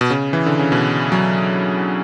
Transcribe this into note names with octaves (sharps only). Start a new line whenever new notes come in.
B2
C#3
E3
D3
C#3
B2
F#3